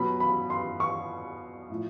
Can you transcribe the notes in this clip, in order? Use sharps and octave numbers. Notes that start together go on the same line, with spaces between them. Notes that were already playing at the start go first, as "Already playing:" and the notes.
Already playing: B2 F#3 B5
B5
C6
C#6
A2 F3